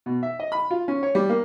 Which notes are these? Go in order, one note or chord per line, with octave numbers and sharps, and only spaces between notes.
B2
E5
D#5
B5
F4
C#4
C#5
G3
A#3